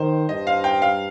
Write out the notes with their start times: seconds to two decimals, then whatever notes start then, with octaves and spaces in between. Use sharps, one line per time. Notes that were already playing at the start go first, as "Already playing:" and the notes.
Already playing: D#3 C5
0.29 G2 D#5
0.47 F5
0.64 G5
0.82 F5